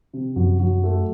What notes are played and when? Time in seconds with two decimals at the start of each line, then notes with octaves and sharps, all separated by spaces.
0.13 C3
0.36 F#2 F#3
0.60 F#3
0.84 A3